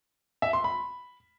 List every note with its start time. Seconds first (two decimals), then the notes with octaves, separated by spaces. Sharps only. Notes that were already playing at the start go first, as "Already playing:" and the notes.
0.42 E5
0.53 C6
0.64 B5